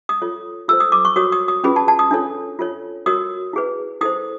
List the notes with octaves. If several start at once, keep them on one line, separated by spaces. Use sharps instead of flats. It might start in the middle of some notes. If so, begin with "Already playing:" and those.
D#6
F4 A4 C#5
F4 A4 C5 E6
D#6
D6
C#6
F#4 A#4 C#5 D#6
D#6
D#6
C#4 F4 G#4 B4 B5
A5
A5
D#6
D4 F4 A4 C#5
F4 A4 C#5
F#4 A#4 C#5 D#6
E4 G#4 B4
E4 A4 C5 D#6